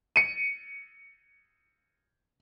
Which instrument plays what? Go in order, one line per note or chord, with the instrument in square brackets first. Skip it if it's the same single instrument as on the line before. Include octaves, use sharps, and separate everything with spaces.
[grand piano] C#7 D#7